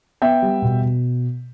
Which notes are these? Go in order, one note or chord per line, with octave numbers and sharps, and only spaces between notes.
B3 E5 G5
G3
B2
B2